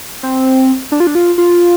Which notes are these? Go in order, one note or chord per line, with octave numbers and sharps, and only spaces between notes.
C4
D4
F4
D4
F4
F4